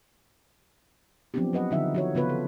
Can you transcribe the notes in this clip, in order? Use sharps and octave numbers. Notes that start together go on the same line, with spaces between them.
F3 F#3 B3 C4 D4 G4
F#3 B4 D#5 F#5
D3 D#3 F3 D#4 E5
F3 F#4 C#5
C#3 B3 F4 B4
A4